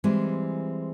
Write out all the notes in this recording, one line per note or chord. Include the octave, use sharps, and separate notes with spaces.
E3 G3 G#3 C4